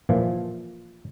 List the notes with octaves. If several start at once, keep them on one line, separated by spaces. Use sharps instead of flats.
A#2 E3 F3